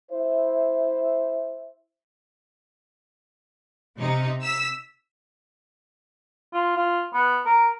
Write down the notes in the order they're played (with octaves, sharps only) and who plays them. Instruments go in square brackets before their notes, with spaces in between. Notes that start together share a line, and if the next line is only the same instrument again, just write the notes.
[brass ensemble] E4 C5 E5
[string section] C3 D#4
E6 B6
[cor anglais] F4
F4
B3
A#4